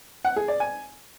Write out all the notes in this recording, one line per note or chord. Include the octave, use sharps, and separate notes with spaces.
F#5
G#4
D5
G#5